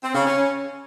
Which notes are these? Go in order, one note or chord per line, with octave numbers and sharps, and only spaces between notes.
C4
C#3
C#4